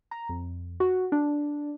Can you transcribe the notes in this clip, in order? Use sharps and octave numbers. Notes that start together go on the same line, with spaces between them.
A#5
F2
F#4
D4